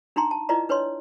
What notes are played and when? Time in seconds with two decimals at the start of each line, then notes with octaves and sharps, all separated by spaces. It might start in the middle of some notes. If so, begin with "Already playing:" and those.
0.16 D4 D#4 G5 A#5 C6
0.31 A5
0.49 E4 F4 B4 D5 D#5 A#5
0.69 D4 B4 C#5 D#5 C6